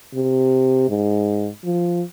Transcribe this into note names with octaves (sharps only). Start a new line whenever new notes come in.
C3
G#2
F3